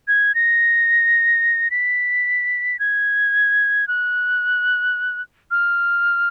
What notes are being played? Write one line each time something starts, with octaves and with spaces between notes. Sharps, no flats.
G#6
A#6
B6
G#6
F#6
F6